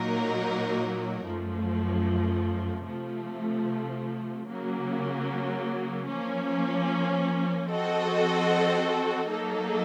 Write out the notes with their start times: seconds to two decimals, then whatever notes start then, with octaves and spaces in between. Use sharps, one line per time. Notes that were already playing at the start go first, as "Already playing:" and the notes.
Already playing: A#2 F#3 A#3 D#4 A#4
1.25 F#2 F3 A3
2.86 C3 F3 A3
4.47 C#3 F#3 A#3
6.08 F3 A#3 C#4
7.69 F3 C4 F#4 A4 D#5
9.29 F#3 A#3 D#4 A4